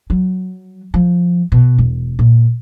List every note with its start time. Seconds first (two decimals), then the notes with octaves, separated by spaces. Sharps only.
0.10 F#3
0.94 F3
1.52 B2
1.78 E1
2.19 A#2